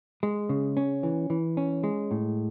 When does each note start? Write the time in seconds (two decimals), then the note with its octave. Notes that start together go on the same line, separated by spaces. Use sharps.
0.23 G#3
0.49 C#3
0.77 C#4
1.03 E3
1.30 E3
1.57 C#4
1.84 G#3
2.11 A2